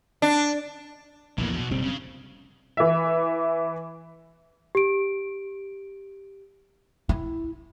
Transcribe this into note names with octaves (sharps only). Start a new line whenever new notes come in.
D4
A#1 E2 A2 E3 A#3
B2 F#3
F#1 B1 G3 C4
C#3
E3 E5
G4 D7
E4